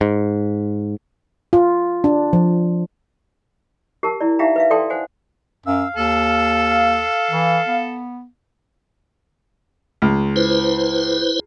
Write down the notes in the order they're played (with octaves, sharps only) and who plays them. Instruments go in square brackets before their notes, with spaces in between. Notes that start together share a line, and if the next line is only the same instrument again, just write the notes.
[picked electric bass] G#2
[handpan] F4
D4
F3
[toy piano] G4 A#4 A5
E4 D5
D#4 G4 E5 F5 G5 A#5
B4 E5 F5
A4 D5 F5 G5 A5 C6
C5 F#5 G#5
[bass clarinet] F#2 [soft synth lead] F5 [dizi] E6
[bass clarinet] D#2 [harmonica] A4 [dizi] E6
[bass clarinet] E3
B3
[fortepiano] C#2
[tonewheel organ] E4 B4 C5